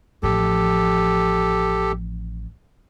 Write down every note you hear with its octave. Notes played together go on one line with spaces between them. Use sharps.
A1 F3 G4 A4